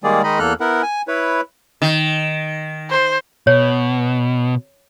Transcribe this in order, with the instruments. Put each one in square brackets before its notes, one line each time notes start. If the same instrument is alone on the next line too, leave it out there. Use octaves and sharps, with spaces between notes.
[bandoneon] D#3 G3 G#3 A#3 G#4 D5
D#3 G#3 D#4 D#5 B5
E2 A#3 A4 F6 F#6
B3 E4 A#4 F#5
G#5
E4 B4 C#5
[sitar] D#3
[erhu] C5
[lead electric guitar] B2 [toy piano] C#5